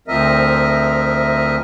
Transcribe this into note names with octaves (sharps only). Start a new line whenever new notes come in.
D2 F3 C4 A#4 D#5 E5